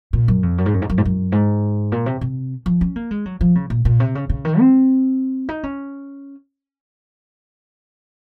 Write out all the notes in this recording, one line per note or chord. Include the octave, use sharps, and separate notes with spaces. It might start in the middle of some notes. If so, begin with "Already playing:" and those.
A#2
F#2
F2
F#2
G#2
F#2
G#2
F#2
G#2
F#2
G#2
A#2
C3
C3
F3
C#4
A#3
G#3
F#3
F3
C#3
A#2
A#2
C3
C#3
C#3
D#3
C4
D#4
C#4